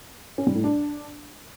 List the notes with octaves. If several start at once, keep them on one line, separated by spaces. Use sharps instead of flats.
C#4
G3
A2
D4